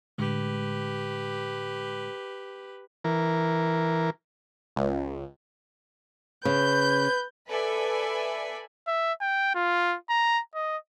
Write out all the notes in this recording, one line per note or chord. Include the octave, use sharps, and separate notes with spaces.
A2 D3 G#3 G4 B4
E3 A#4
C#2
C#3 B4 G6
A4 B4 D5 E5 G#5 B5
E5
G5
F4
A#5
D#5